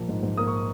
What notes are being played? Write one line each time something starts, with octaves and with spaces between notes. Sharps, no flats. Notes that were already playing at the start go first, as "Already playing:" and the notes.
Already playing: A#1 A#3
G#2
G#2
A#3 D#6
C#6